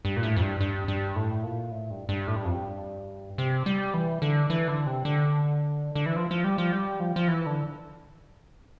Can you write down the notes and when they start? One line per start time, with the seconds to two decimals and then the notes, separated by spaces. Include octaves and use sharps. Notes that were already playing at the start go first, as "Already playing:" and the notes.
0.05 G2
0.17 A#2
0.23 A2
0.36 F2
0.42 G2
0.61 G2
0.88 G2
1.16 A2
1.44 A#2
1.71 A2
1.90 G2
2.09 G2
2.27 A2
2.36 G2
2.45 F2
2.55 G2
3.38 C3
3.66 G3
3.94 E3
4.22 D3
4.50 E3
4.68 D3
4.86 C3
5.05 D3
5.95 D3
6.06 E3
6.16 F3
6.31 F3
6.44 G3
6.58 F3
6.72 G3
7.00 F3
7.16 F3
7.28 E3
7.46 D3